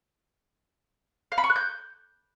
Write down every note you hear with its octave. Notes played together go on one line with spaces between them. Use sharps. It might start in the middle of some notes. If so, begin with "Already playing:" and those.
F5
B5
C#6
F#6
G6